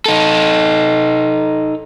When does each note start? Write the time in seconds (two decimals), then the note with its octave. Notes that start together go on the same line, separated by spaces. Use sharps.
0.06 D#4 A4